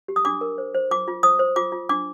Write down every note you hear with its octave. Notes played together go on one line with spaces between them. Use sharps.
G4
D#6
D4 D6
A#4
C5
C5
F4 D6
F4
C5 D#6
C5
F4 D6
F4
D4 D6